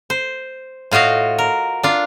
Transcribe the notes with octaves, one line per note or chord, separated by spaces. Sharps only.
C5
A2 F4 F#4 D#5 F5
A#4
D4 F4